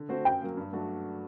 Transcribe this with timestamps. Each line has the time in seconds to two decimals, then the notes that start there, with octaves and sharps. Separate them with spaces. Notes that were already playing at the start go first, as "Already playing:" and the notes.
Already playing: D3
0.09 A3 C4 F#4 C5
0.25 F#2 G5
0.42 F#3 A#3
0.57 G2
0.72 F#3 A3 D4 F#4